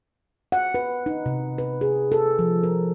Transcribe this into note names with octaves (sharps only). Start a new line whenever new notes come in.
F#5
B4
D#4
C3
B4
G#4
A4
F3
A#4